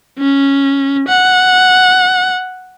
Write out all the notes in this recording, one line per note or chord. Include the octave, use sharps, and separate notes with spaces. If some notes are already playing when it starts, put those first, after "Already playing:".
C#4
F#5